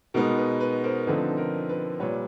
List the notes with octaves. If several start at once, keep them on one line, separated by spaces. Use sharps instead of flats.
B2 G#3 B3 D#4 A#4
B4
B4
A#4 C5
D3 F3 A3 C4 D#4 B4
A#4
B4
A#2 G3 B4 C#5